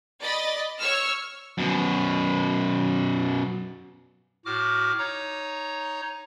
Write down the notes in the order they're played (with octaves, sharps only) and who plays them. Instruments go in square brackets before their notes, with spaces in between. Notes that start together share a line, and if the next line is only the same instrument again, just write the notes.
[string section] D5 D#5 B5 A6
C#5 C#6 E6 F6
[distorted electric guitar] F#2 B2
[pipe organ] A2 F#4 D6 F6
D#4 C#5 A#5